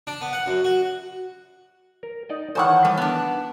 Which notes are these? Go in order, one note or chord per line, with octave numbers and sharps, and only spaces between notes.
D4
B3
F#5
F#2
F#4
A#4
D#4 D5 D#5
D#3 E3 A4 C5 C#5 F#5
G3 A3
B3 D4